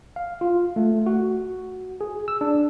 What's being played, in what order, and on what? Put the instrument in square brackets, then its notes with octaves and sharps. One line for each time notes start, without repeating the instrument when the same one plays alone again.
[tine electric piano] F5
F4
A3
F#4
G#4
E6
D4